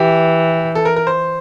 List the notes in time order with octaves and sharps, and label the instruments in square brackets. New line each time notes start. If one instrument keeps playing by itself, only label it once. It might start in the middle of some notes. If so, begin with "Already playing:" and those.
Already playing: [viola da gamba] E3 [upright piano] G4
[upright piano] A4
A#4
A#4
C5